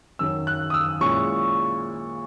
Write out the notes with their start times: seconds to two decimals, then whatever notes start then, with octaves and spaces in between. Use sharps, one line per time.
0.19 F#2 D#3 F#3 E6
0.47 F#6
0.70 D#6
0.74 E6
1.01 A#2 G#3 C#4 E4 C#6